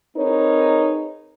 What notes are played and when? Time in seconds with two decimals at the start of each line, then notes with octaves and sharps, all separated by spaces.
0.17 C4 D#4 G#4 A#4 B4 C#5